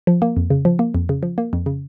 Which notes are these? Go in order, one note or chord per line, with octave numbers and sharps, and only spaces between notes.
F3
A#3
F2
C#3
F3
A#3
F2
C#3
F3
A#3
F2
C#3